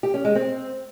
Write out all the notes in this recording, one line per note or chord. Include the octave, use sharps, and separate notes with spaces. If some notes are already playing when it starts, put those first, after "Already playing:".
G4
C#4
G#3
C4